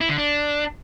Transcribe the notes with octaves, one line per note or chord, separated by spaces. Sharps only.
E4
D3
D4